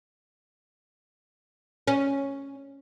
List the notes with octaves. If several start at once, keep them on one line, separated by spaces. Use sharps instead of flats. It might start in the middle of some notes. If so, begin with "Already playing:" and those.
C#4